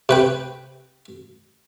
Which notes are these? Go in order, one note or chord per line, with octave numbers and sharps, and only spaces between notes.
C3 B4 G5